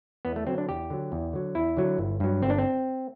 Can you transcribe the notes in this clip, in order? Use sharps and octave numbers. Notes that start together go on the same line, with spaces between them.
E2 B3
A3
D3 F#3 C4
D4
E2 G4
D3 F#3
E2
D3 F#3
E2 E4
D3 F#3
G1
G2 F#3
G1 C4
D4
C4